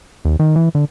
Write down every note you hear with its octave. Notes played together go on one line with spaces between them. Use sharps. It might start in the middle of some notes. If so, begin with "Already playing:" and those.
D#2
D#3
E3
D3